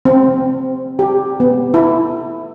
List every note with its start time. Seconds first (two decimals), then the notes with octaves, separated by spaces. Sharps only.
0.05 C4
0.99 G4
1.40 B3
1.74 E4